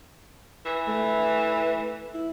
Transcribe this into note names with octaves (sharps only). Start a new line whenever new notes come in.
E3
A3
E4